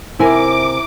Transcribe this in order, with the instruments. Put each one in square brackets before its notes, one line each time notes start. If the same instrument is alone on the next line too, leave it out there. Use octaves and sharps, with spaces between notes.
[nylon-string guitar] C3 C5 G#5 [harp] E4 A#4 [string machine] D6